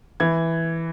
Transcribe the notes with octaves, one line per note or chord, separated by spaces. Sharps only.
E3 G#6